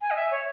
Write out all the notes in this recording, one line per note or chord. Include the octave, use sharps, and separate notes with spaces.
G#5
D#5
E5
C#5